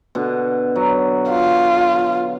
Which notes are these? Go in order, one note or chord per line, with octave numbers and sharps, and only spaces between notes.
B2 D3
F#3
F4